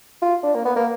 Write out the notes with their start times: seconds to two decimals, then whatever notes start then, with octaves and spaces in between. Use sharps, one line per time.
0.22 F4
0.43 D4
0.54 A#3
0.65 B3
0.76 A#3